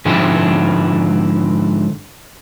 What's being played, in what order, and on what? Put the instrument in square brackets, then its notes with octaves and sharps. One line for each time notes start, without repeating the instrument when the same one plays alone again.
[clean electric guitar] G#2 D3 F3 G#3 C4 E4